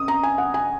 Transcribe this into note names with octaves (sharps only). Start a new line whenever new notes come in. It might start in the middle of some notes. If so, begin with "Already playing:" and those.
Already playing: C#3 D#6
A#5
G#5
F#5
G#5